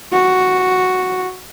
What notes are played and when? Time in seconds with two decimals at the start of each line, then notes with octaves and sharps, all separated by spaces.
0.13 F#4